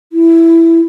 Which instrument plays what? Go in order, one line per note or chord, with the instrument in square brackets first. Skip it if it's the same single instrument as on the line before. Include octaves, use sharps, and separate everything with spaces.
[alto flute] E4